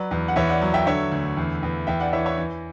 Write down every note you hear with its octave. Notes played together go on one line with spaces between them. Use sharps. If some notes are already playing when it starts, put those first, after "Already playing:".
Already playing: F#3 B4 D5
E2
F#5
E2 C#5 E5
D5 F#5
F#3
E5 G5
D3 C#5 E5
D2
E2
E2
E2 E5 G5
D5 F#5
E3 C#5 E5
C#5 E5
E3